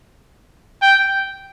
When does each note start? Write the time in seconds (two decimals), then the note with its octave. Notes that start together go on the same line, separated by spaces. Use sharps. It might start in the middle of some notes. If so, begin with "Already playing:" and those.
0.82 G5